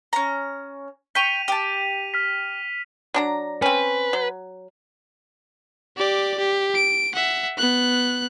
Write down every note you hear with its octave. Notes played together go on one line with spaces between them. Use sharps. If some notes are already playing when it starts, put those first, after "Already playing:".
C#4 A#5
G5 C#6 B6 D#7 F7
G4 A5
F6 B6
F#3 D4 A#5
C4 C#4 B4
F#3
G4 D5
G4
D7
E5 F#5
B3 F#6